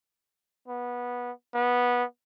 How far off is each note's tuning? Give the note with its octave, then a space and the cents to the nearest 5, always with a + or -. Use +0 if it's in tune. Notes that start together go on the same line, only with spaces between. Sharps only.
B3 -15
B3 -15